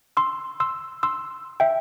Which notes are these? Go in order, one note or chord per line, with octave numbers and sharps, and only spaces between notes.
C6 E6
C6 E6
C6 E6
E5 G5